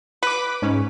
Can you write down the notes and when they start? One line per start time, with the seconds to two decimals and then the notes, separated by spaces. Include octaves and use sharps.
0.23 B4 D6 B6
0.62 G#2 C#4